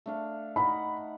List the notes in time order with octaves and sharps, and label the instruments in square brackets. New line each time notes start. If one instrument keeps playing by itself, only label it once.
[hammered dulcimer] A3 D4 F5
[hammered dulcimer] D#4 F#5 [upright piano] B5